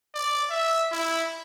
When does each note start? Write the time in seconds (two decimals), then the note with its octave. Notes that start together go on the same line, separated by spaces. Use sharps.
0.15 D5
0.50 E5
0.92 E4